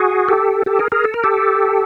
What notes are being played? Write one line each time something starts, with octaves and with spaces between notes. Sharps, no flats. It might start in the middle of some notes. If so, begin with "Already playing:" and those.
Already playing: F#4 G#4
G4 A4
G4 A4
G#4 A#4
G#4 A#4
A4
A#4
G4 A4